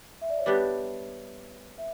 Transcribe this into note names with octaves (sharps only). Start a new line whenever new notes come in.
E5
D5
C#5
G3 B3 D4 G4 B4
E5